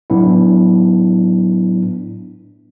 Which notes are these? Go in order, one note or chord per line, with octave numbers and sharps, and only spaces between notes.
A2 F#3 B3 D4 E4